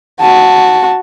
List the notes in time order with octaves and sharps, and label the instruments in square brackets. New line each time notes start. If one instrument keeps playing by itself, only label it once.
[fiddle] F#4 [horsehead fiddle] A5